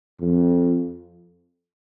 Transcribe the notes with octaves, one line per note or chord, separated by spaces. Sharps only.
F2